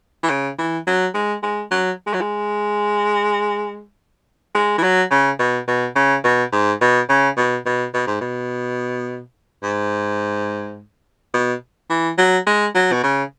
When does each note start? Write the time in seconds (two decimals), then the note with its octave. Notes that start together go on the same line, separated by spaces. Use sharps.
0.23 E3
0.30 C#3
0.59 E3
0.87 F#3
1.15 G#3
1.43 G#3
1.71 F#3
2.07 G#3
2.14 F#3
2.21 G#3
4.55 G#3
4.78 E3
4.83 F#3
5.11 C#3
5.39 B2
5.68 B2
5.95 C#3
6.24 B2
6.52 G#2
6.81 B2
7.09 C#3
7.37 B2
7.66 B2
7.94 B2
8.07 G#2
8.21 B2
9.63 G#2
11.34 B2
11.90 E3
12.18 F#3
12.47 G#3
12.75 F#3
12.92 B2
13.03 C#3